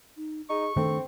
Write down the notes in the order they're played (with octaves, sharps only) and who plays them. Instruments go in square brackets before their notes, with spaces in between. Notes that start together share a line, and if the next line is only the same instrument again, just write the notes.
[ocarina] D#4
[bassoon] D#4 [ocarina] G#4 [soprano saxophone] C#6
[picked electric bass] D#3 A3 D4 [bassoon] C4 [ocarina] A4